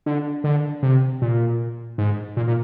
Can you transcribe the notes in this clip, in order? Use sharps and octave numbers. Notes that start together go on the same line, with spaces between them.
D3
D3
C3
A#2
G#2
A#2
A#2